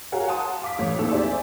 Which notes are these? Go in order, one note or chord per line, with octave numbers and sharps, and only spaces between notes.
F#4 G#4 A#4 C#5 F5 F#5
F#5 A5 C6 D#6
F5 D6 B6
A1 A3 C#5
A#1 D#2 C4 G4 A4 E6
D#4 G#4 C5 D5 E5 G#5